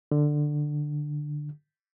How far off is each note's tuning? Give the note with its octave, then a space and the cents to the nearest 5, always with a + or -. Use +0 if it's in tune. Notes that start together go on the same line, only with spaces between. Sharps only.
D3 +10